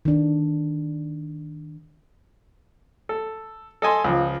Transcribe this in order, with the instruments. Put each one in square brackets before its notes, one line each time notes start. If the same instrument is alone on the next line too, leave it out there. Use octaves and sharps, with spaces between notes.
[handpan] D#3 D4
[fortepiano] A4
A4 D#5 G#5 C6
C#2 F3